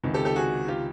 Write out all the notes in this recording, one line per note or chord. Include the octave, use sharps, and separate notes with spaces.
C#2 C3 D#3
G4 A4
G4 A4
F#4 G#4
F4 G4